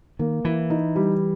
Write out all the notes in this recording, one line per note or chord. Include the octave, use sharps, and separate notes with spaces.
D#3 A#3
E3 E4
D#4
G3